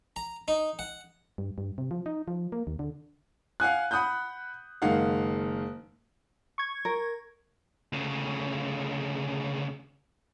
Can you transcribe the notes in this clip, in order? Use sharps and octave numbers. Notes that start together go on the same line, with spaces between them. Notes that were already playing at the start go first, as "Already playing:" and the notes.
A#5
D#4
F#5
G2
G2
C3
F3
D#4
F3
A#3
D#2
D3
F5 F#5 G#5 F#6
F#5 B5 D#6 F#6 G6
F#1 D#3 G#3 F5 F#5
C#6 G#6
A#4
D2 C#3